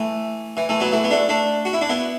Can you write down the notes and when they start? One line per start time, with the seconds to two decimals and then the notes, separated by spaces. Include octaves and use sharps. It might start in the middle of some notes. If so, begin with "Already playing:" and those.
Already playing: E3 A3
0.57 E3
0.69 E3 A3
0.80 F#3 B3
0.93 E3 A3
1.04 B3
1.11 A3 D4
1.29 A3 D4
1.65 F#4
1.73 E4
1.81 D4
1.89 B3 E4